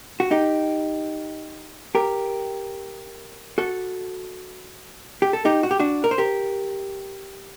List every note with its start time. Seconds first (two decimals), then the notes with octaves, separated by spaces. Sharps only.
0.20 F#4
0.31 D#4 G4
1.95 G4 A#4
3.58 F#4 A4
5.22 G4
5.33 A4
5.45 D#4 G4
5.63 F#4
5.71 G4
5.79 D4 F#4
6.04 A#4
6.11 C5
6.18 G4 A#4